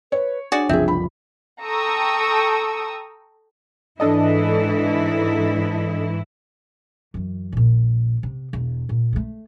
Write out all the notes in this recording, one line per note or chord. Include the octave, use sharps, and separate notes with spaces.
B4 C#5
D4 F#4 G#4 D5
F#1 C2 F3 C4 G#4 E5
B5
A4 G5 A#5 C#6 D#6 E6
G#2 E3 D4 E4 A4 D#5
F#2 E3
A#1 A#2
C3
E1
A#2
G2 A3